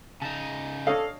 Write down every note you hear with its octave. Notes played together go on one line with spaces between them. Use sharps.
C#3 D#4 A5
D4 A4 C#5 D#5 F5